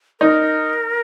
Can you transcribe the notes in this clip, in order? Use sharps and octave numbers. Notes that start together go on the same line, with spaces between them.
D#4 A#4